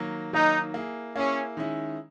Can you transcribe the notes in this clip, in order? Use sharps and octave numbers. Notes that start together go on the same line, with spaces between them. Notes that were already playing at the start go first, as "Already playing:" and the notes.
Already playing: D#3 F#3 A#3
D#3 F#3 A#3 D#4
A#3 E4 G#4
A#3 C#4 E4 G#4
D#3 G#3 C#4 E4